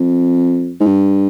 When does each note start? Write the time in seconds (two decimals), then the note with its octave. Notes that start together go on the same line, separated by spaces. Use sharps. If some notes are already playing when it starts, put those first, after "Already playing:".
Already playing: F2
0.80 G#2
0.86 G2